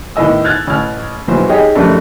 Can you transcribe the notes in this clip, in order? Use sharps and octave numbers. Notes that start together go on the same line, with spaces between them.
E2 A2 D#3 D#5 E6
F6 F#6 G#6 A6
A1 F6
A#1 B2 E3 F#3 C5
D#4 G4 G#4 C#5 D#5 G5
F#2 F3 G3 A3 D4 D#4